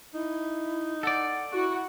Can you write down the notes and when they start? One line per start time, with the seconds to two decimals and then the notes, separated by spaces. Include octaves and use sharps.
0.14 D#4 E4
1.03 A4 D5 F#5
1.54 E4 F#4